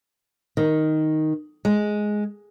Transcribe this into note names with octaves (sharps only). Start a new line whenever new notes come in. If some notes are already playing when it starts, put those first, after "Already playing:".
D#3
G#3